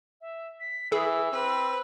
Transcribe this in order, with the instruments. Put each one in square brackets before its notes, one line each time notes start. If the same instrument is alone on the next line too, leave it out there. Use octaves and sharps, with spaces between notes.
[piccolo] E5
B6
[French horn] E3 [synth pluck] G#4 [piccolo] E6
[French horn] C4 [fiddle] B4